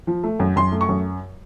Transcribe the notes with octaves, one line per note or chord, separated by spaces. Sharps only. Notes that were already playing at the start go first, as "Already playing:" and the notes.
F3
A3
F#2
F#2 C6
A3
C#6
F#2